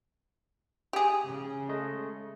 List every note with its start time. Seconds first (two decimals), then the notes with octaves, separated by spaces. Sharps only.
0.93 G4 G#4
1.26 C#3
1.69 G#3 A3 D#5